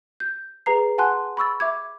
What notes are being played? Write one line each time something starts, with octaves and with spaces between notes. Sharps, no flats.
G6
G#4 B4 A#5 C7
F#5 G#5 A5 C6 F#6
B5 C#6 E6 A6
E5 D6 G#6